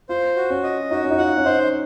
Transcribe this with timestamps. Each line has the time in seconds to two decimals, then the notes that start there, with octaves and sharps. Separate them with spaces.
0.09 F4 C5
0.36 F#4
0.50 C#4
0.64 D#5
0.91 D#4 F#4
1.04 C#4
1.11 D#4
1.18 F4 F#5
1.38 C#4
1.45 D#4 C5